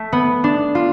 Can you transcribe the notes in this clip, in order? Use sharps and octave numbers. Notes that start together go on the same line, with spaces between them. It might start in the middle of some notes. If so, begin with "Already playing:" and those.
Already playing: A3
B3
D4
F4